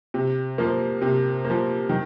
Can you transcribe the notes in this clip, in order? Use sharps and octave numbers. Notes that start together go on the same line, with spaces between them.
C3
F3 A#3
C3
A#3
F3
D#3